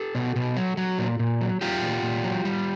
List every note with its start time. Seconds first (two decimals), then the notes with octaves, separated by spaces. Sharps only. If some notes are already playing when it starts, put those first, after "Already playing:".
Already playing: G4 A4
0.15 B2
0.36 B2
0.57 F#3
0.77 F#3
0.99 A#2
1.19 A#2
1.41 F#3
1.61 F#3 F4 G4
1.82 A#2
2.03 A#2
2.24 F#3
2.45 G3